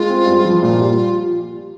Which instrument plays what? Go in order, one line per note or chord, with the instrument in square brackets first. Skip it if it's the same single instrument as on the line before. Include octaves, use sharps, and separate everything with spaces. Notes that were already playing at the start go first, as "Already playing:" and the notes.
Already playing: [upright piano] G#3 [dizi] F4
[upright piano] C4
G2
F3
[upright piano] A#2 [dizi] F4
[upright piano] G3